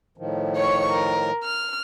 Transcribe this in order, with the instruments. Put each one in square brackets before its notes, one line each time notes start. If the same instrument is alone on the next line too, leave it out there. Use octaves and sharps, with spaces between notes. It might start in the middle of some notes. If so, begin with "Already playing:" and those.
[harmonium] A2 D#3 F3
[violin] C#5 C#6
A#4
F6